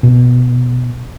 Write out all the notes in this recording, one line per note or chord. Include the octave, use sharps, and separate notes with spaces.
B2